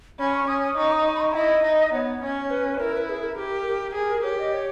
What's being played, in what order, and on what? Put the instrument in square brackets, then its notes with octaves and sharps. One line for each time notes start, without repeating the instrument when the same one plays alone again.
[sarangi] C#4 [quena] B5
[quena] C#6
[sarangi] C#4 [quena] D#6
[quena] D#6
[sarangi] D#4 [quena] C#6
[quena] D#6
C#6
B5
C#6
[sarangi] E4 [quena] D#5
[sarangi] D#4
[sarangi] B3 [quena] C#5
[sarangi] C#4
[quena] B4
[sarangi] E4 [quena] A#4
[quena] B4
G#4
A#4
[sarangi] G4
[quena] A#4
[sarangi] G#4
[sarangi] G4 [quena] C#5
[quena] D#5
C#5